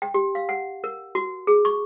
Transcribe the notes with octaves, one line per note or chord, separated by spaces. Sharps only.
G5
G4
F5
F#5
A#4
F#4
G#4
C#6